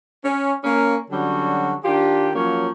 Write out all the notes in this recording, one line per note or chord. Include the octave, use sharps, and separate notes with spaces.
C#4
A#3 C#4
D3 F#3 G3 C#4 F#4
D#3 D4 F4 G4
F3 F#3 A#3 C#4 C#5